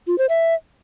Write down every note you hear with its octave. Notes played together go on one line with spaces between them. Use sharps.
F4
C5
E5